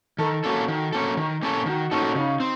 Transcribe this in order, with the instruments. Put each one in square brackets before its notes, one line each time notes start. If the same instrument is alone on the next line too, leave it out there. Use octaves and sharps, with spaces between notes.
[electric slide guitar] D#3 [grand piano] A4
[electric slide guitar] A#3 C#4 A4 [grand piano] F#4
[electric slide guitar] D#3
A#3 C#4 A4
D#3
A#3 C#4 A4
[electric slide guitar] D#3 [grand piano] F#4
[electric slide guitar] A#3 C#4 A4 [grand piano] D#4
[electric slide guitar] C#3 [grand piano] D#4
[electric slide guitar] C4